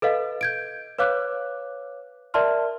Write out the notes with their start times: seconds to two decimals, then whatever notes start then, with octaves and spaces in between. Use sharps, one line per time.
0.02 A4 B4 D#5 F5
0.41 G6 G#6 D7
0.99 B4 C#5 F5 D6 F#6
2.34 A#4 D5 E5 A5 C6 F6